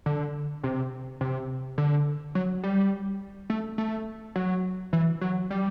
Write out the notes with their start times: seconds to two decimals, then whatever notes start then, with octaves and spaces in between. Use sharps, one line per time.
0.06 D3
0.64 C3
1.21 C3
1.78 D3
2.35 F#3
2.63 G3
3.50 A3
3.78 A3
4.36 F#3
4.93 E3
5.21 F#3
5.51 G3